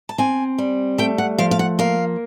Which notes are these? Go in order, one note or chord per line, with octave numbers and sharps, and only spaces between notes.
A5
C4 G#5
G3
A3 G5
F#5
F3 F5
F5
F#5
A#3 F5